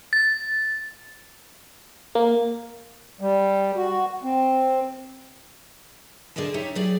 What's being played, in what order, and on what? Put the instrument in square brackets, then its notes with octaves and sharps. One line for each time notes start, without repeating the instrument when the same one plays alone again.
[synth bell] A6
[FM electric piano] A#3
[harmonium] G3
F#4
C4
[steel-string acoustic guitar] D3 G#4 D5 D#5 A5
D#4 G4 C#5 E5
F#3 A3 G4 G#4 D5